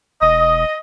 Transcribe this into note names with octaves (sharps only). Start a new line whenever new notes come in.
E1 D#5